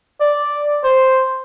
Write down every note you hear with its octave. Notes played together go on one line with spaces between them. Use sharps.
D5
C5